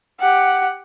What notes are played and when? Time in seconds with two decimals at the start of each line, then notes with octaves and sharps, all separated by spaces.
0.19 G4 F#5